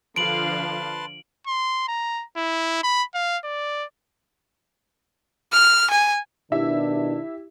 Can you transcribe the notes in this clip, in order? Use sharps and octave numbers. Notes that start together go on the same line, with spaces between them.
D3 F3 B4 F5 A5 C6 D7 F#7
C6
A#5
E4
B5
F5
D5
F6
G#5
B2 D#3 D4 E4 G4 E5